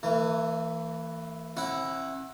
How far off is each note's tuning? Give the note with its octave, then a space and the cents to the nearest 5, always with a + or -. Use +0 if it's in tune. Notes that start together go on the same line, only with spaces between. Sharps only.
E3 +0 A#3 -45
C4 +45 E4 +0 F#5 -5